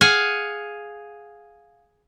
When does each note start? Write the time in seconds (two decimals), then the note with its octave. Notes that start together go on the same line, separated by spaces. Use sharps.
0.01 G#4 F5 F#5 G#5